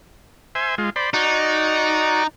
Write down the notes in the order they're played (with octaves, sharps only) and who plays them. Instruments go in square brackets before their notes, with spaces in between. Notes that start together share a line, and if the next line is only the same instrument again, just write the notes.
[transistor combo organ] C5 E5 G#5
G#3 F4
C5 D5 B5
[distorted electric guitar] D#4 [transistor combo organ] F#4 D5